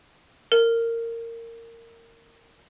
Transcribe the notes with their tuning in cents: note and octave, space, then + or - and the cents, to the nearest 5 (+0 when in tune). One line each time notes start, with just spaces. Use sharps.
A#4 -20